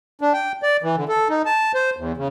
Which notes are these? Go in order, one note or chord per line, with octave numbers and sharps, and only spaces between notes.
D4
G5
D5
E3
D3
A4
D#4
A5
C5
E2
C#3